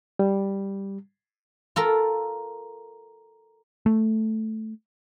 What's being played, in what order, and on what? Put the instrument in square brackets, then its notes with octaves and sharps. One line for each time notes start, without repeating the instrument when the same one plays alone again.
[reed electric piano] G3
[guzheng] F4 A4 A#4
[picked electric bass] A3